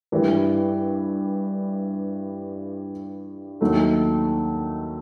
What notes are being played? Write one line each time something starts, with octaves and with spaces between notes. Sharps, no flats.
G2 E3 G3
D#2 D#3 F#3 A3